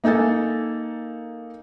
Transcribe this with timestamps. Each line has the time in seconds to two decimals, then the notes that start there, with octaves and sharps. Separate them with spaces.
0.04 A#3 D#4 A4 G#5 A6